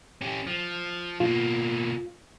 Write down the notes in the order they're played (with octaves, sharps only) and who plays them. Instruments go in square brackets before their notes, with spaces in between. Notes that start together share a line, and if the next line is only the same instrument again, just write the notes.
[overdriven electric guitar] C#4 G4
F3
[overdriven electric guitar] B2 A#3 [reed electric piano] F4